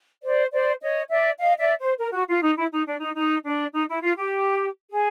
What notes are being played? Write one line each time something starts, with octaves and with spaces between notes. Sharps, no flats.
C5 D5
C5 D5
C#5 D#5
D5 E5
D#5 F5
D5 E5
C5
A#4
F#4
F4
D#4
E4
D#4
D4
D#4
D#4
D4
D#4
E4
F4
G4
G#4